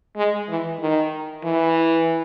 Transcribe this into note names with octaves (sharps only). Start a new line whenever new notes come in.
G#3
E3
D#3
E3